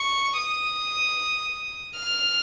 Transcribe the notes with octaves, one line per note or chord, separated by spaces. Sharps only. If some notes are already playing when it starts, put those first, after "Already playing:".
Already playing: C#6
D#6
F6